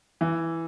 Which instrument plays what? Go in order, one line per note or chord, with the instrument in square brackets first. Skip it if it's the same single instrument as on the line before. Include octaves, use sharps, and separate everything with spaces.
[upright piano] E3